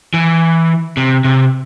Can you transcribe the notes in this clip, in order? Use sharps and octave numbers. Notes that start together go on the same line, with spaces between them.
E3
C3
C3